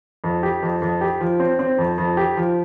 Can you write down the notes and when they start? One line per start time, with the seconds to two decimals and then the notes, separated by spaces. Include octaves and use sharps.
0.24 F2
0.43 G4
0.62 F2
0.82 F2
1.01 G4
1.21 F3
1.40 C4
1.59 C4
1.78 F2
1.98 F2
2.17 G4
2.37 F3